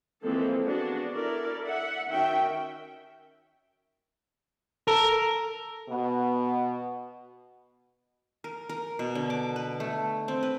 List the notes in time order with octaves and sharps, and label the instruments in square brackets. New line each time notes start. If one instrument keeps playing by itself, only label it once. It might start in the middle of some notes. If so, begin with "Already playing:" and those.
[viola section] E3 F3 G#3 A#3 C4 A4
B3 D4 F#4 G#4
E4 A4 A#4 D5
E5 F#5
D#3 C#4 F#4 E5 G5
[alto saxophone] A4 [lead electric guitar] A#4
[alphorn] B2 [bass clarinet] B3
[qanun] A#4
A#4
B2
D3
D6
B4
A3
C4
B4